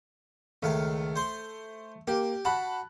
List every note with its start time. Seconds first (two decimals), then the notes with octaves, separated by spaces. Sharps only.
0.63 C#2 D#3 A3 F5
1.16 C5 C6
2.07 A#3 G4
2.45 F#4 A5 B5 F#6